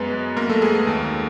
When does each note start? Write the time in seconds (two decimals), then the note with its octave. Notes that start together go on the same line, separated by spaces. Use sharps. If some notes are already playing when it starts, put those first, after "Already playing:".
Already playing: F#2 G#3 B3 B4
0.11 G#3
0.36 F#2 A#3 A#4
0.50 A3 A4
0.62 G#3 G#4
0.75 A3 A4
0.87 D#2